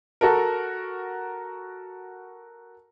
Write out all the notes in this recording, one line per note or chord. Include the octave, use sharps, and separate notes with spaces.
F#4 A4 A#4